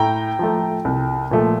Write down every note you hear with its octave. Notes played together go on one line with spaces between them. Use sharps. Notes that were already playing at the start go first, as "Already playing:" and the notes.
Already playing: A2 G5 A#5
F3 A3
C2
A#2 F3 A3